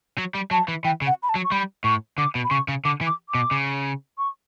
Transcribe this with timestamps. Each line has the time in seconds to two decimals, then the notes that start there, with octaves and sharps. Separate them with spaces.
0.18 F#3
0.35 G3
0.51 F#3 A5
0.68 E3
0.85 E3 G5
1.02 C#3
1.07 F#5
1.23 B5
1.29 A5
1.35 F#3
1.44 C#6
1.52 G3 B5
1.84 A2 C#6
2.18 D3 D6
2.35 B2
2.44 B5
2.51 C#3 C#6
2.68 C#3
2.85 D3 D6
3.01 E3
3.06 D6
3.29 D6
3.35 B2
3.51 C#3
4.18 C#6